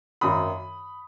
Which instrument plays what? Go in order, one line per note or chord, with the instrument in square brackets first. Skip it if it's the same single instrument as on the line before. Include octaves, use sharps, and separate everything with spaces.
[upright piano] G#1 F#2 D#3 B5 D#6